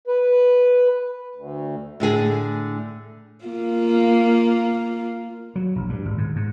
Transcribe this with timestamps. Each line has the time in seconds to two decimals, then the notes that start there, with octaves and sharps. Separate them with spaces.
0.07 B4
1.35 D2
2.00 A2 D3 G#4 A4
3.45 A#3 F4
5.56 F#3
5.76 A#1
5.89 G2
6.05 G#1
6.18 G#2
6.36 G#2